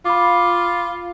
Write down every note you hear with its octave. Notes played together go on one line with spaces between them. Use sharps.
F4 B5 D6